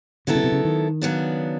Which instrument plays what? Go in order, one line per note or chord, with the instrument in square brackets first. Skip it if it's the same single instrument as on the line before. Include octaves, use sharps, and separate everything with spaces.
[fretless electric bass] D3 [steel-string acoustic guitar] F#3 B3 E4 A4
[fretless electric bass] C#3
C3
C#3
D#3
[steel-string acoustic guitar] C#3 F#3 B3 D4